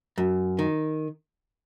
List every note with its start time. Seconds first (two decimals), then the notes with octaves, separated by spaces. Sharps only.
0.18 F#2
0.59 D#3